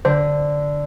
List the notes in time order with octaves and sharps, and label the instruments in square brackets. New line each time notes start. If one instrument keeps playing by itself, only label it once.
[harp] D3 [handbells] C5